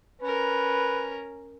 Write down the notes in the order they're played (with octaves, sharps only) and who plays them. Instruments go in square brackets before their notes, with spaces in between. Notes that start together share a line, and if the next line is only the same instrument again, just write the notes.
[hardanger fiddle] C#4 A#4 [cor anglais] B4